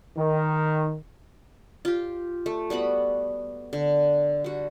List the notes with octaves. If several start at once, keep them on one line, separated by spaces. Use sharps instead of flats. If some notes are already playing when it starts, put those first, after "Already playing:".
D#3
F4 G4
A3
G3 B3 F#4 B5
D3
G3 F#4